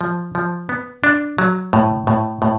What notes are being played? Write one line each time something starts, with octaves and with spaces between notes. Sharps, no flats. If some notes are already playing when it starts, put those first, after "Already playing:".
F3
F3
B3
D4
F#3
A2
A2
A2